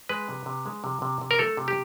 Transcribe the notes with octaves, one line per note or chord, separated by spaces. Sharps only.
G#3 B4
C3
C3
G#3
C3
C3
C3
A#4
A3 A4
C3
G4